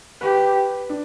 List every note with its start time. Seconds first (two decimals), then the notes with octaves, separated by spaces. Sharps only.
0.21 G4 B4
0.90 D4